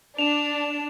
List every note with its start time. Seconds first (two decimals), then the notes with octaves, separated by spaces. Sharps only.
0.18 D4 E7 F7